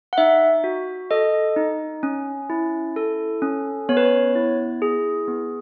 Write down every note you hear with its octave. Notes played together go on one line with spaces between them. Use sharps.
F#5
D#4 E5
F#4
A4 D#5
D#4
C#4
E4
A4
C#4
B3 C#5
B4
C#5
E4
G#4
B3